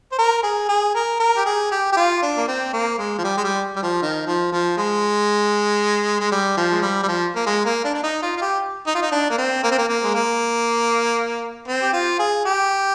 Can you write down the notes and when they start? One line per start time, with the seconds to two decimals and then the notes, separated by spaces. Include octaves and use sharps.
0.12 C5
0.18 A#4
0.43 G#4
0.69 G#4
0.95 A#4
1.20 A#4
1.37 G4
1.46 G#4
1.71 G4
1.92 G4
1.97 F4
2.22 D4
2.37 A#3
2.48 C4
2.73 A#3
2.98 G#3
3.19 F3
3.24 G3
3.37 G#3
3.44 G3
3.76 G3
3.83 F3
4.02 D#3
4.27 F3
4.52 F3
4.77 G#3
6.20 G#3
6.32 G3
6.57 F3
6.71 G#3
6.82 G3
7.03 G3
7.08 F3
7.36 A#3
7.46 G#3
7.65 A#3
7.84 D4
7.95 D4
8.03 D#4
8.22 F4
8.37 F4
8.41 G4
8.87 D#4
8.95 F4
9.02 D#4
9.12 D4
9.31 A#3
9.38 C4
9.63 A#3
9.71 C4
9.78 A#3
9.88 A#3
10.04 G#3
10.15 A#3
11.68 C4
11.82 G4
11.93 F4
12.19 G#4
12.45 G4